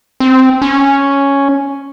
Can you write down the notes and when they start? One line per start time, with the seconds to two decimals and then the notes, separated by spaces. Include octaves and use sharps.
0.20 C4
0.62 C#4